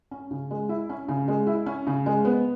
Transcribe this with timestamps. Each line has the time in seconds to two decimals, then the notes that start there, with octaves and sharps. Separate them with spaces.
0.11 C#4
0.31 C#3
0.51 G#3
0.69 E4
0.89 C#4
1.08 C#3
1.28 G#3
1.47 E4
1.66 C#4
1.87 C#3
2.06 G#3
2.25 B3